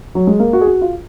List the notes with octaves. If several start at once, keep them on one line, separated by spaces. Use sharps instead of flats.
F#3
G#3
A#3
F#4
G#4
F#4
F4